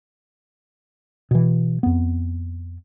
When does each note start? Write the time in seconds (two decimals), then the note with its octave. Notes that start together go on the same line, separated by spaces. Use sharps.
1.31 B2 E3
1.83 F2 B3